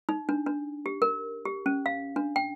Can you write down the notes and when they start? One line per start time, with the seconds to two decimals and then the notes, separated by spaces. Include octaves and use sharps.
0.09 D#4
0.29 D4
0.46 D4
0.86 G4
1.02 A#4
1.45 G4
1.66 C#4
1.86 F5
2.16 D4
2.36 G5